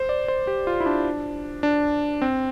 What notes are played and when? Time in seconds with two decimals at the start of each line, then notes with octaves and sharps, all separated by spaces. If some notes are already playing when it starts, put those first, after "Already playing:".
Already playing: C5
0.09 D5
0.28 C5
0.47 G4
0.67 F4
0.80 E4
0.86 D4
1.63 D4
2.22 C4